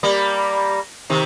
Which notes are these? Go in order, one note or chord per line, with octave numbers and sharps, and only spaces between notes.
G3 A#3
C3 D#3